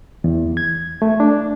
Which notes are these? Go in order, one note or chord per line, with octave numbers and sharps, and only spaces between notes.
E2
G#6
A3
D4